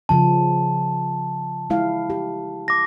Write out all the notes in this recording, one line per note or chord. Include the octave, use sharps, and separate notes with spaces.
C#3 F3 C#4 A5
G#3 E4 F5
G4
D6 A#6